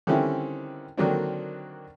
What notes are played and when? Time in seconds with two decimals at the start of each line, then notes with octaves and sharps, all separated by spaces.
0.07 D3 D#3 G3 C4 C#4 E4
0.98 D3 D#3 F#3 A#3 C4 D4